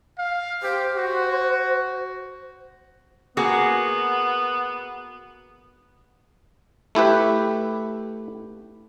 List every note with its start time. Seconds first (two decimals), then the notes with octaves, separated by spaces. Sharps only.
0.19 F5
0.63 G4 C5
0.97 F#4
3.37 A#3 B3 F#4 G#4
6.95 A3 E4 G4 B4